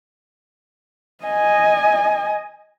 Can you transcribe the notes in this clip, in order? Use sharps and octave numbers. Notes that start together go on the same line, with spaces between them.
D#5 G#5